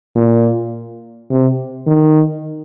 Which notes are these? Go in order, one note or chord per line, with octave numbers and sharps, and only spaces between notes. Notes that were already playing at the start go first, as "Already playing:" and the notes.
A#2
C3
D#3